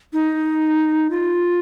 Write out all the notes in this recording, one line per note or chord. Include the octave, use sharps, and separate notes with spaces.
D#4
F4